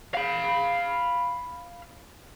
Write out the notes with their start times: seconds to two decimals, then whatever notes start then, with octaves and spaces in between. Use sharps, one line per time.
0.15 F5 B5